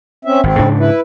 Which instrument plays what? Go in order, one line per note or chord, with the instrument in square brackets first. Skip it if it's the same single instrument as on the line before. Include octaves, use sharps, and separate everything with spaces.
[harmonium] C4 C#4 E5
[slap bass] G#1 [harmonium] C4
[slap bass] G#2 C#3 D4
[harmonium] E4 B4